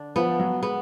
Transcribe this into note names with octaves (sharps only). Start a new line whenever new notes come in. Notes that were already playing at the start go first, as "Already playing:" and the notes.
Already playing: D3 D4
F3 B3
F#3
G#3 B3